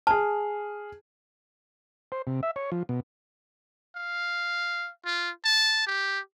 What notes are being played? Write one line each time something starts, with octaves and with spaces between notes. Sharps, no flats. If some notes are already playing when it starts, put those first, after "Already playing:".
G#4 A5 F6
C5
C3
E5
C#5
F3
B2
F5
F4
A5
G4